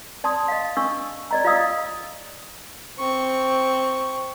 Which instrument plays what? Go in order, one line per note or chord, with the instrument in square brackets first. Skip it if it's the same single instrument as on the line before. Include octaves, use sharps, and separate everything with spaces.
[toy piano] D5 A5 C6 D#6
D#5 F5
D4 C#6 E6
D5 D#5 A#5
F4 D5 D#5 F5 D#6 E6
[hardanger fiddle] C4 C#6